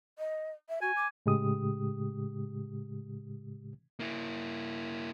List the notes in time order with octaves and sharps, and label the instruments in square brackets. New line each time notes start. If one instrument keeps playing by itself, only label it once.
[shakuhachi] D#5
E5
[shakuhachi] F#4 [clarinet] G#5
[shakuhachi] D6
[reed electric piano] A2 C#3 G#3 G4 D#6
[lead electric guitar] A#3 E4